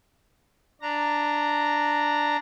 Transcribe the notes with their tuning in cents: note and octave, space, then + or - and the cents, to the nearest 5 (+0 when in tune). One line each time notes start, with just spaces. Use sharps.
D4 +0 A#5 -10